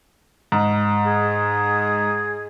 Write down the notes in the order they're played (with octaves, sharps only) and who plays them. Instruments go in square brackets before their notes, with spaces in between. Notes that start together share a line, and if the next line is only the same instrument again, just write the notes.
[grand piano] G#2
[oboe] G#4